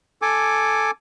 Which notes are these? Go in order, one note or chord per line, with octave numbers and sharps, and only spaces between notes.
A4 G#5 D6